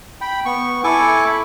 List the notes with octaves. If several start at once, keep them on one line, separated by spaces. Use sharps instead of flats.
G5 B5
B3 C#6
E4 A4 G#5 C#6 D6
B5